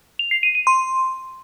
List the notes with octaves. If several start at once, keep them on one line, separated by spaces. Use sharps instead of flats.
F7
C7
D#7
D#7
C6